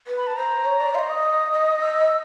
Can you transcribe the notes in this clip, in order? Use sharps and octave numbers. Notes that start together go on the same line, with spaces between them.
B4
B5
A5
C5 A#5
C#5
D5
D#5 F5 C6
D#6
D#5
E6